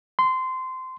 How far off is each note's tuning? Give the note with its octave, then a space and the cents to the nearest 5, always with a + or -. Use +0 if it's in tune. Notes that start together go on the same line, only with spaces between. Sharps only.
C6 -20